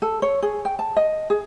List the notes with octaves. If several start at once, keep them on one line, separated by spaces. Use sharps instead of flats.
A4
C#5
G#4
G5
A5
D#5
G#4